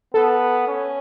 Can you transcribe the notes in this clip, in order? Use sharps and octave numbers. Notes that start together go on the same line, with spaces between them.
B3 A4
C#4